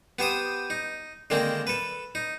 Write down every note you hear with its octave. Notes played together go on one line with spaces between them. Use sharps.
B3 G4 C5 D#6
D#4
D3 D#3 G#3 A#3 C4
A4 B4
D#4